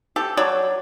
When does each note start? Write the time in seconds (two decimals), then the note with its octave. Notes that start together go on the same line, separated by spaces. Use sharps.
0.16 G4 A4
0.37 F#3 C#5 D5